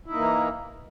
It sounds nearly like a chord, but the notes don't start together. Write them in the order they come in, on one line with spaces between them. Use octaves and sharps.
E4 D#4 A#3 E3